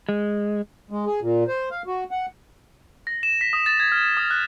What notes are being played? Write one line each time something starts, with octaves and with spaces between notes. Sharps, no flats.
G#3
G#3
G#4
A#2
C5
F5
F#4
F#5
A#6
E7
B6
D#6
A6
G#6
F6
A6
D#6
F#6